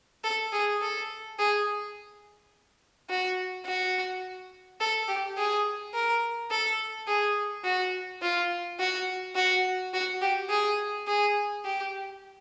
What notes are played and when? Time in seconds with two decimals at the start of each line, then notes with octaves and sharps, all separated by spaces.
0.24 A4
0.53 G#4
0.82 A4
1.39 G#4
3.10 F#4
3.66 F#4
4.81 A4
5.08 G4
5.38 G#4
5.94 A#4
6.51 A4
7.07 G#4
7.64 F#4
8.22 F4
8.80 F#4
9.36 F#4
9.94 F#4
10.22 G4
10.49 G#4
11.08 G#4
11.65 G4